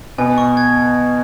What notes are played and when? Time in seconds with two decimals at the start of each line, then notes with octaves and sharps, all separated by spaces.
0.18 B2 B3 G#5
0.38 C#6
0.57 G#6